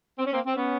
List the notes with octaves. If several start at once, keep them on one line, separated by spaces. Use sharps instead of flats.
C4
C#4
A#3 C4
C4
B3 C#4